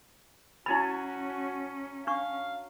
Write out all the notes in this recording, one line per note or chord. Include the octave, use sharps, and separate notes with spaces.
F#3 C#4 E4 F#4 G#5 A5 B5
D4 F5 C#6